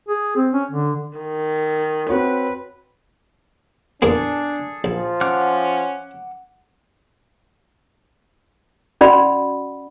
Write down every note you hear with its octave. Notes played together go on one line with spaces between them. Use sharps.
G#4
C4
C#4
D3
D#3
C4 F#4 B4 C#5
E2 A#2 A#3 D4 G#4 A4
A#1 F3
C#4 F#5 D6 F6
C#4 F#4 D5 F#5 B5